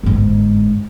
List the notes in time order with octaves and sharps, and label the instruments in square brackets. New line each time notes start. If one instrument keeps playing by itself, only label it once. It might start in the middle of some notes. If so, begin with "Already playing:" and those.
[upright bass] G1 G#2